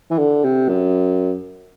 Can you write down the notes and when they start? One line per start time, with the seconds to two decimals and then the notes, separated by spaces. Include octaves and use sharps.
0.11 E3
0.18 D3
0.44 C3
0.68 F#2